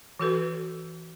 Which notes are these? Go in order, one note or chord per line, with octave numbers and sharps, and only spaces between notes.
E3 F#4 A4 B4